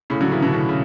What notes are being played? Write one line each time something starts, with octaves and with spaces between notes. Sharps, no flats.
A2 C#3
D3 F#3
C#3 E3
B2 D3
A2 C#3
C#3